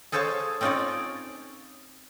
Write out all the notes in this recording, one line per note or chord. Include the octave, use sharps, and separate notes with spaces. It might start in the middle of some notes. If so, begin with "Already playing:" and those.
G#4 A4 C5 C#5 F5 A5
C4 C#4 D#4 F4 C#5 D5